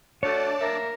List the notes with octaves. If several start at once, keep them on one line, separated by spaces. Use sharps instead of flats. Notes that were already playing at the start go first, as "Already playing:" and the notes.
A3 D4 F#4 C#5 D5 A5
A#3 A#4 E5